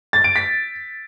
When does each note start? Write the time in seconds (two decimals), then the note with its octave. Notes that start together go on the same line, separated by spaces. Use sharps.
0.13 A6
0.24 D7
0.36 B6